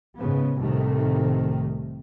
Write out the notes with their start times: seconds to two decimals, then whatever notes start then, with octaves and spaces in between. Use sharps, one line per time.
0.16 G#2 C#3 B3
0.57 C2 A2 C3 D#3 A3